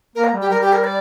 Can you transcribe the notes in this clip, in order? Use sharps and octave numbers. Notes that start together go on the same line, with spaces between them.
A#3 A#4
A#5
G3
G4
G3 A#4
G4
A#4
D5